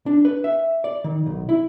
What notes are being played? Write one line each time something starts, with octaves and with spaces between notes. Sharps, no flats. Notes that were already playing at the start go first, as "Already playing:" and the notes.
D4
B4
E5
D5
D#3
B1
E4